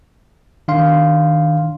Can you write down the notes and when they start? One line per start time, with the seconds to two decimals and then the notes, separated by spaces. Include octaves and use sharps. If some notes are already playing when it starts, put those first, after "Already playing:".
0.68 D#3 D4 F5 C6